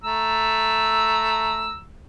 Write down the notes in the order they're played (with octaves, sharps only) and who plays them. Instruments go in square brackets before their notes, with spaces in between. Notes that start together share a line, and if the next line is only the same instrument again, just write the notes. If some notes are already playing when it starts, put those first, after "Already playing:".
[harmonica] A3 A#5 E6